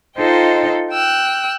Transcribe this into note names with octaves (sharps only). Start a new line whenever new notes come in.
D#4 F4 A4 C5 D#5 G5
G5 E6 F#6